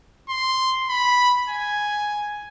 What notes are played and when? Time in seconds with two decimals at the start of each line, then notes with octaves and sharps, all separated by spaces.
0.29 C6
0.89 B5
1.49 G#5